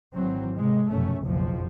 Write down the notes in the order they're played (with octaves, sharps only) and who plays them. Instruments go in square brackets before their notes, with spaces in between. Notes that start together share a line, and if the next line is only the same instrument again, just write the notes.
[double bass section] G#1 E3 F#3 C4
C3 G#3
F1 F#2 B2 A3 C#4
F#1 B1 F2 B2 F3